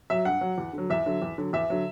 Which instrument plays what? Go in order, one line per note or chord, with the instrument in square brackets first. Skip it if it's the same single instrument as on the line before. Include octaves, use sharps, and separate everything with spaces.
[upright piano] F#3 E5
G2 F#5
F#3
E2
D3 F#3
E2 E5
D3 F#3
E2
D3 F#3
E2 E5
D3 F#3